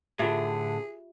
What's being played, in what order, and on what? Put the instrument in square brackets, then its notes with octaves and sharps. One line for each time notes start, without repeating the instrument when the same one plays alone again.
[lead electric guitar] A2 D3 [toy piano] F4 G4 E5 [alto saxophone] G#4